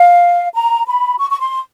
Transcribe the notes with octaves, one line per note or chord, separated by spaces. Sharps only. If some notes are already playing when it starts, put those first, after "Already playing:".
Already playing: F5
A#5
B5
C#6
C#6
C6